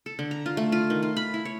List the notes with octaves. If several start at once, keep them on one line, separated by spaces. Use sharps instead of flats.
A4
D3
A#5
F4
A3
F4
D#3
F4
B5
E4
C#5